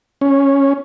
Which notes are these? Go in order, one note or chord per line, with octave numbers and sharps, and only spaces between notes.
C#4